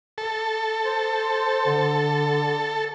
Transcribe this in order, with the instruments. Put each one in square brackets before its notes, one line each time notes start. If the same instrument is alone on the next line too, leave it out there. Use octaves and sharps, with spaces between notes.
[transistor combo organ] A4
[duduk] C5
D3